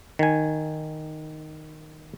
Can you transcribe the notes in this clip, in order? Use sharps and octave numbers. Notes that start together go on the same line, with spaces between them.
D#3 G#5